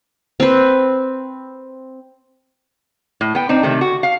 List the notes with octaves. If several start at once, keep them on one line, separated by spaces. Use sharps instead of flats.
C4 B4
A2
B3 G5
C4 D4 D#4
C3 D#3 A3
F#4
F5